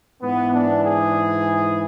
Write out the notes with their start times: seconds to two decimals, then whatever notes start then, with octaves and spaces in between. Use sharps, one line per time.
0.22 G#2 E3 B3
0.53 D4
0.84 G#4